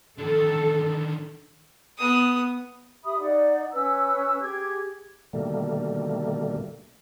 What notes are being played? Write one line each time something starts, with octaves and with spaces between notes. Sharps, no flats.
D3 D#3 A4
B3 D#6
G4 E5 B5 D#6
D#4 D5 F#5
C#4 B4 E6
G4 G#4 G#6
B2 D3 D#3 G3 A3 A#3